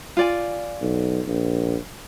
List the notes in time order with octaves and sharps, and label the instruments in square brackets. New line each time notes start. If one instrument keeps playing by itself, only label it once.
[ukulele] F4 D5 G#5
[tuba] B1
A#1